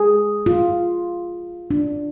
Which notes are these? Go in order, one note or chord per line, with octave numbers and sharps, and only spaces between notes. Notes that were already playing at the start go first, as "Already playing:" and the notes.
Already playing: G#4
F4
D4